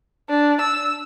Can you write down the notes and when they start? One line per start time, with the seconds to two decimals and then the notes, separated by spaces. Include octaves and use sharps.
0.29 D4
0.61 E6